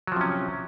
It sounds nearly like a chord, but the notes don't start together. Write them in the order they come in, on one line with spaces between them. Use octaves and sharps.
F#3 F3 C3 C#4